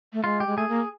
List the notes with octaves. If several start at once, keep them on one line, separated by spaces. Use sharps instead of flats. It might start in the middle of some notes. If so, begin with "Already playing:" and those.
A3
G#3 F4
G4
G#3
A3 G#4
A#3